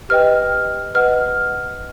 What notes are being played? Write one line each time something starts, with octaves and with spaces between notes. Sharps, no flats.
G4 B4 D#5 G5 F6
B4 D#5 F#5 F6